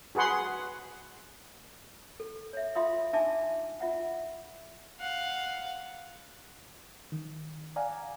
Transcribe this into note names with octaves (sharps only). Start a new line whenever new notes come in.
F#4 G#4 B4 F#5 C6
A4
C#5 E5
F4 E5 F5 C6 D#6
D4 D#4 E5 G#5 A5 D6
F4 E5 F#5
F5 F#5
D#3
D5 F5 F#5 G#5 A#5